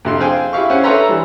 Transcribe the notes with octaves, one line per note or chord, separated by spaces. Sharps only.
F2 C3 C6
G#4 C5 F5 G5 G#5 C6
E4 G4 E5 F5 C#6
C#4 G4 C5 F#5
A4 B4 C#5 E5 A#5 C6
E3 G3